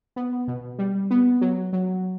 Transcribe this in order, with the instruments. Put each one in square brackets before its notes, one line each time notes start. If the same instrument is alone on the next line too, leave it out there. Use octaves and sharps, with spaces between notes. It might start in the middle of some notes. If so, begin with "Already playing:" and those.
[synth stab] B3
B2
G3
B3
F#3
F#3